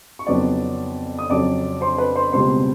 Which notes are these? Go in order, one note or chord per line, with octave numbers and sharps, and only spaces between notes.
C#6
F2 C#3 F#3 B3 D#4 D5 D6
D#6
F2 C#3 F#3 D5 D6
C5 C6
B4 B5
C5 C6
C#2 B2 G3 C4 C5 C6